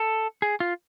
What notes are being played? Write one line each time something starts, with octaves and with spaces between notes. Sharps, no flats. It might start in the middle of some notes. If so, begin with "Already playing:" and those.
Already playing: A4
G#4
F4